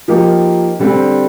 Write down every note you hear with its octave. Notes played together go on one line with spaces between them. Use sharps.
F3 A#3 D#4 G4
D3 G3 C4